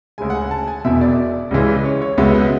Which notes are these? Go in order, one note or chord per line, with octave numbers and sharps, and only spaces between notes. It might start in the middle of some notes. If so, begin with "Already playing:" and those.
D2 C#3 G#3 G#5
F#5
G#5
A5
G#5
E1 E2 B2 E5
D5
C#2 C#3 E3 G#3
C#5
C#5
C#2 B2 G#3 B3 E5
F#5